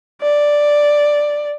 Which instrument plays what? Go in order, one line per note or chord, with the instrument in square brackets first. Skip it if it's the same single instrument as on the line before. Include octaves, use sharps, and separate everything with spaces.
[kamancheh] D5